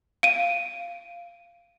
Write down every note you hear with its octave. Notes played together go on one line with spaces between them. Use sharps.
F5 D7 D#7